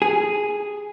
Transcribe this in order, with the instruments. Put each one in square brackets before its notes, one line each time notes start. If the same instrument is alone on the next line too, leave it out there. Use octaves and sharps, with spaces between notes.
[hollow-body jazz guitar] G#4